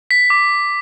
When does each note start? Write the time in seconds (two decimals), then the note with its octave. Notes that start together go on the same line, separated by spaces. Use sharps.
0.11 B6
0.30 D6